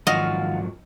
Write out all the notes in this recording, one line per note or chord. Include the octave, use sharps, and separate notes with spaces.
G#2 D#3 F3 F#3 F4 F#4 D#5 F5